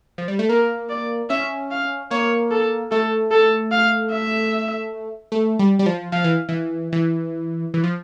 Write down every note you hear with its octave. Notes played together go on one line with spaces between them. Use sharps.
F3
G3
A3
A#3 A#4
D5
C#4 E5
F5
A#3 C#5
A4
A3 A4
A4
F5
E5
A3
G3
G3
F3
F3 F5
E3
E3
E3
E3
F3